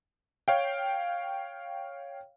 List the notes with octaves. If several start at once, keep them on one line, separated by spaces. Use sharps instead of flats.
C#5 F5 G5